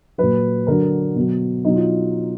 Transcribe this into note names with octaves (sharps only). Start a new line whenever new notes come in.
A#2 F#3 B4
D3 F#3 A#4
B2 F#3
B2 F#3 D#4
F4